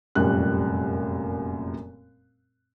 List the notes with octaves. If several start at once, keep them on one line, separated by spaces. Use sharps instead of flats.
F1 F#2 A#2 G3 C#4 F#6